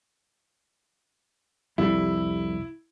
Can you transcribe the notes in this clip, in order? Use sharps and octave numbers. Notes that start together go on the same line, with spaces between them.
C2 F2 G3 E4